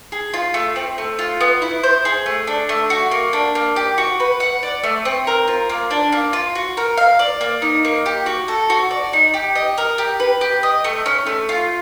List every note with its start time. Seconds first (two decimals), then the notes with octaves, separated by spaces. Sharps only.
0.12 G#4
0.34 F4
0.54 A3
0.76 C4
0.98 A3
1.19 F4
1.41 B3
1.62 E4
1.83 C5
2.05 G#4
2.26 A3
2.47 D4
2.69 A3
2.90 F#4
3.11 A#3
3.33 D4
3.55 A#3
3.76 G4
3.98 F#4
4.20 B4
4.40 F#5
4.63 D5
4.84 A3
5.05 C4
5.27 A#4
5.48 F4
5.70 A#3
5.91 D4
6.12 A#3
6.33 F4
6.55 F#4
6.77 A#4
6.98 F5
7.19 D5
7.41 A#3
7.62 D#4
7.85 A#3
8.06 G4
8.26 F#4
8.48 A4
8.70 F#4
8.91 D5
9.13 D#4
9.34 G4
9.55 D#5
9.78 A#4
9.98 G4
10.20 B4
10.41 G4
10.63 D#5
10.84 A3
11.06 C#4
11.27 A3
11.49 F4